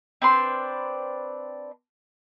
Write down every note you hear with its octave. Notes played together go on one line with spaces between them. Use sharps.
C4 D4 B4 C6